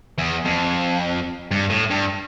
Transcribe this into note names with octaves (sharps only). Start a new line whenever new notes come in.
E2
F2
G2
A2
G2